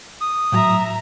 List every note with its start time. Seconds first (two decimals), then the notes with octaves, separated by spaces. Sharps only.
0.21 D#6
0.52 A2 F#3 E5 A#5